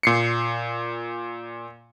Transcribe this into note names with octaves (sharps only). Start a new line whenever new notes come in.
A#2 C7 C#7